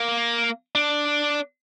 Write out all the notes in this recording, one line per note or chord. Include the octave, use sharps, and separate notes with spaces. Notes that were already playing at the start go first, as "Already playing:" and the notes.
Already playing: A#3
D4